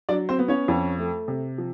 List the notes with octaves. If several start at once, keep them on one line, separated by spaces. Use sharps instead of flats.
F#3 D4 D5
C4 C5
B3
C#4 C#5
F2
A3
C3
F3